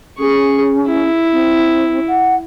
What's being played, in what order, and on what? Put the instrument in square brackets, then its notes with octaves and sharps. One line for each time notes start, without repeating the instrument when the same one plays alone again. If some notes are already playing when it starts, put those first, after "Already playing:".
[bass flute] C#4 [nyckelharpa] G#4 C#6
[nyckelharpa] E4
[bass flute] C4
F#5